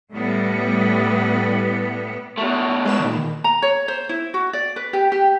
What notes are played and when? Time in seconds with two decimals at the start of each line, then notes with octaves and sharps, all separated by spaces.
0.13 A2 G3 B3
2.38 B2 A3
2.85 G#3 B4 E7
3.00 A#2 D#3
3.44 A#5
3.62 C#5
3.88 C5
4.09 E4
4.34 F#4
4.53 D5
4.76 B4
4.93 G4
5.12 G4